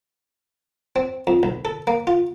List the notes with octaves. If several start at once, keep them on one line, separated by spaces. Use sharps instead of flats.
C4
F2
B1
A4
A#3
F4